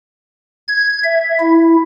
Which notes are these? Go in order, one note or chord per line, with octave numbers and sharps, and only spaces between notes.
G#6
E5
E4